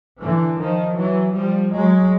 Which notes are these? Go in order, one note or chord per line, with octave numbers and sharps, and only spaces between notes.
D3 E3
D#3 F3
E3 F#3
F3 G3
F#3 G#3